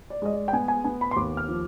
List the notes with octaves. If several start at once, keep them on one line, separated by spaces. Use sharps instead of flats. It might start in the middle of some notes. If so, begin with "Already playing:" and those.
D5
G#3 D#5
D5
G5
B3 G#5
G#5
B3 G#5
B5
C6
D#2 D6
F6
F3